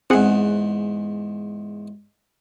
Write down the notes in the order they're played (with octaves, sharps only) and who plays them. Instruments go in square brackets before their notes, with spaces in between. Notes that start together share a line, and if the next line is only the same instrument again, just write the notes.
[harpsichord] E2 G#2 [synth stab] C4 G#4 F#5